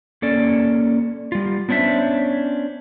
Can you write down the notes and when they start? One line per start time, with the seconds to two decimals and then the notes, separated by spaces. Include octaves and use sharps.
0.22 A#3 C#4 A4 D5
1.32 G3 F4
1.69 B3 C#4 D4 C5 E5